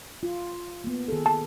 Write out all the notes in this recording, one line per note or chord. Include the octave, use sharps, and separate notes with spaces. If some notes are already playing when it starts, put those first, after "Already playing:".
F4
A#3 B3
D#3 G#4 A4
A5